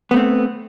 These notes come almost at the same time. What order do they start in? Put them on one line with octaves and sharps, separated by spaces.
B3 A3 C4